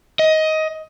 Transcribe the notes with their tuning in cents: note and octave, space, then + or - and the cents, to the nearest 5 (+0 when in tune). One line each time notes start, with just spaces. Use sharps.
D#5 +15